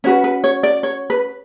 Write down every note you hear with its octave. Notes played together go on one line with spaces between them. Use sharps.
C#4 F#4 B4 C#5
B4
C#5
D5
C#5
B4